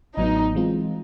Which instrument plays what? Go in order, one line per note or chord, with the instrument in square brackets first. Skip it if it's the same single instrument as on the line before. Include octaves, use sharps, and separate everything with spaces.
[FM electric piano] A1 A2 F#3 B3 [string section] D#4
[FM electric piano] E3 G#3 C4 F4